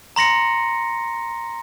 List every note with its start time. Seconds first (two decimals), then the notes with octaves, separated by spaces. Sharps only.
0.16 A#5 C6 A#6 C#7